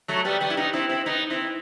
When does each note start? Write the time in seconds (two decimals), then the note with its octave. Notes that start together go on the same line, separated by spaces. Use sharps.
0.08 F#3 A3
0.25 G3 B3
0.41 G3 B3
0.50 E4
0.57 B3 D#4
0.73 C4 E4
0.89 C4 E4
1.06 B3 D#4
1.30 C4 E4